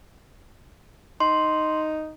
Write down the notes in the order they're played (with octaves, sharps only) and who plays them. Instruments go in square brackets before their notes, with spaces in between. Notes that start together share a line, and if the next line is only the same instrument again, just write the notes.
[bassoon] D#4 [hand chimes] C6